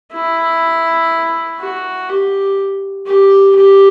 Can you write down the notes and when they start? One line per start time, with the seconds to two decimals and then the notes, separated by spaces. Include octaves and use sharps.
0.13 E4
1.60 F#4
2.09 G4
3.07 G4
3.55 G4